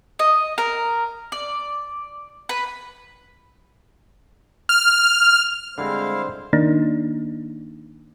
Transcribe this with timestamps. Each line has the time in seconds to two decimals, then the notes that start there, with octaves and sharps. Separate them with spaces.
0.19 D#5
0.58 A#4
1.32 D5
2.49 B4
4.69 F6
5.78 D3 G3 G#3 C4 E4 C5 F5
6.53 D#3 A#3 D4 D#4